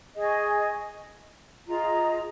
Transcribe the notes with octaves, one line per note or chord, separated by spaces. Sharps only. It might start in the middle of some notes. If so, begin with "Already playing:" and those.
G#4 D#5 G#5 C#6
F4 G#4 D#5 A#5